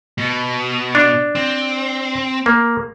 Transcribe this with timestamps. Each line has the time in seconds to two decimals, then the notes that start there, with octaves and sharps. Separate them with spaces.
0.18 B2
0.95 D4
1.35 C4
2.46 A#3